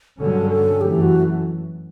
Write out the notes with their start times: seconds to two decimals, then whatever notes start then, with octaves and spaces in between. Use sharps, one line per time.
0.20 G2 D3 F#3 C#4 A4
0.51 A4
0.81 F#2 E3 A3 G4
1.02 F#4